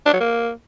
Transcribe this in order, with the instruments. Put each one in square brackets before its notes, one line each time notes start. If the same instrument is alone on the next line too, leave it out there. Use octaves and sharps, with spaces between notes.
[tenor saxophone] D4
F#3
A#3